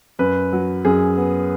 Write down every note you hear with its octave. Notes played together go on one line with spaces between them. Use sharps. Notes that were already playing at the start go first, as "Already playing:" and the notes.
F#2 B4
F#3
F#2 G#4
B3